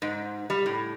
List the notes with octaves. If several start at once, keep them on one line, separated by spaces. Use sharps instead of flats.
G#2
G3
A2